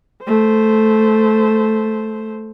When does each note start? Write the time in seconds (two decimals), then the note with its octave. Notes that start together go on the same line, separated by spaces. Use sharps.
0.24 A3 C5